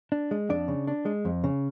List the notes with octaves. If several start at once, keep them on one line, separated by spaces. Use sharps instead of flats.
D4
G#3
F2 D4 D5
C#3
D4
G#3
F2
C#3